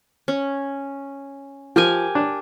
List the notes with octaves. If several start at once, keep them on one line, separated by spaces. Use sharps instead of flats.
C#4
F3 G4 A#4 G#5
D4